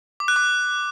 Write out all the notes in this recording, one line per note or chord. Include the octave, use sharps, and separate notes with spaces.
D6
F#6
D6